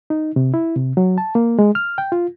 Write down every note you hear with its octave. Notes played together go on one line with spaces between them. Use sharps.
D#4
C3
E4
C3
F#3
A5
A#3
G#3
F6
G5
F4